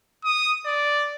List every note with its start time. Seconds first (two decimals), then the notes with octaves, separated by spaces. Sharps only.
0.24 D#6
0.66 D5